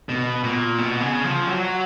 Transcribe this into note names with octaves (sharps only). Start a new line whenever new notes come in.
B2
A#2
B2
C#3
F3
F#3